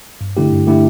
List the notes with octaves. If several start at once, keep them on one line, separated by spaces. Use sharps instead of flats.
G2
D3 A3 E4 G4
G2
D3 A3 E4 G4